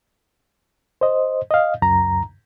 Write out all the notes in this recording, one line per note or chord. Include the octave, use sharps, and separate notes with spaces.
C5 D#5
D#5 F5
C#2 F#2 A#5